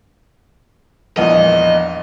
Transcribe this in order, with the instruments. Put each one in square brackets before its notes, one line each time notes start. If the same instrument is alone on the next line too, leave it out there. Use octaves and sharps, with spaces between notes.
[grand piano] A#1 E2 [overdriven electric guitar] D#5